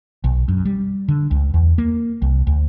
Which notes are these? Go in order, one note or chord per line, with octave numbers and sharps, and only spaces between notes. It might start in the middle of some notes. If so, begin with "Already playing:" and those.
B1
F#2
G3
D3
C#2
E2
A#3
C2
D2